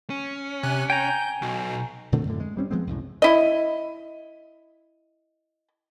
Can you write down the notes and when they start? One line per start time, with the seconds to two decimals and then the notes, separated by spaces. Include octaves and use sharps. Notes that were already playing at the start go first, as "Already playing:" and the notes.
0.10 C#4
0.63 C3 G#5 F#6
0.90 G5 G#5 A#5 G6
1.42 B1 B2
2.12 A#2 D3 A3 C4
2.25 F#2 A2 D3
2.40 G#3
2.57 G3 C4 C#4
2.71 F3 G#3 B3 C4
2.87 C2 F#2 A2
3.22 E4 D#5